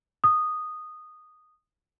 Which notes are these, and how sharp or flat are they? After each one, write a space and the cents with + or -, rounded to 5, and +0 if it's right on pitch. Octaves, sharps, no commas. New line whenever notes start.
D#6 -10